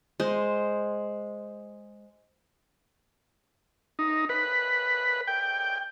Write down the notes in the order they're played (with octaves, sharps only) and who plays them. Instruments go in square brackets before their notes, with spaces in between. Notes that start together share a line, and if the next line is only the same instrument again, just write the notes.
[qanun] G#3 C5
[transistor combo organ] D#4
B4
G5